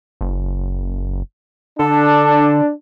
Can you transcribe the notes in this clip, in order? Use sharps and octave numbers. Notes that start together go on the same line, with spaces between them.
F#1
D3 D4 A4